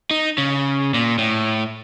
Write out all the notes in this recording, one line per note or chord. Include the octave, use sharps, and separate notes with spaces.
D#4
C#3
A#2
A2